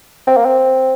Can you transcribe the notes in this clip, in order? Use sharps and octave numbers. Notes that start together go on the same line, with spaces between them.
C4
A#3
C4